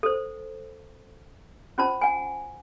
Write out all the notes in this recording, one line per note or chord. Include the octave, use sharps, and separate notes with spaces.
A4 C5
C#4 F4 C5 A5
F#5 G#5